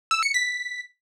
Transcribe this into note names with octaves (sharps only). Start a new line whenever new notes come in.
E6
C#7
B6